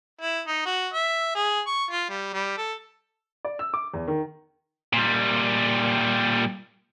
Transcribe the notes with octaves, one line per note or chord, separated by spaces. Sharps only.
E4
D#4
F#4
E5
G#4
C#6
F4
G3
G3
A4
D5
E6
D6
E2
D#3
A#2 G3